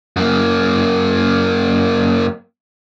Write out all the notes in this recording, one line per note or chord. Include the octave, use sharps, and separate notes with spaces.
F#2 A#3